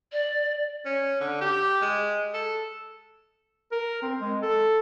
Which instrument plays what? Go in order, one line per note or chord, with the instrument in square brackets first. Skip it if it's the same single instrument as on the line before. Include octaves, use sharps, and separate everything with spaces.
[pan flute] D5
[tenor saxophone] C#4
D3
G4
G#3
A4
[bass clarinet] A#4
C4
G#3
A4